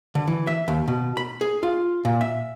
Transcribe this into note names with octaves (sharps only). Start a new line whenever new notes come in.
D3
E3
E5
D#2
B2
B5
G#4
F4
A#2
E5